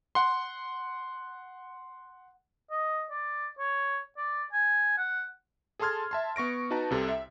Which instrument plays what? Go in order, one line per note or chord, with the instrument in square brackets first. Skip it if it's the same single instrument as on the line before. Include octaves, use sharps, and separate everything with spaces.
[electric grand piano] F#5 C6
[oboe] D#5
D5
C#5
D5
G#5
F#5
[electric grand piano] G#4 A4 A5 C6 F6 G#6
E5 A5 C6
B3 C#6 A#6 D7
D#4 F#4 B4 A5 A#5
C2 C3 A4
E5